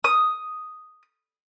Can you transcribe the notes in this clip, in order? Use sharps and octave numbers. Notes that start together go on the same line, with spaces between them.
D#6